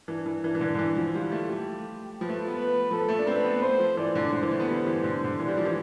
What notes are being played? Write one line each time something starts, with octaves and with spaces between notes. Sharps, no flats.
E3 D4
E3
E3 D4
E3
D3
D3
E3
F3
G3 F4
A3
A3 G4
F3 B4
A3
B3
B4
F3 A4
A3
D4
C4 B4
B3
A3 C5
F3
E3 D5
D3
D3 C5
E3
A3
B3
G3 C5
E3
D3
D3
E3 D5
G3
F3
E3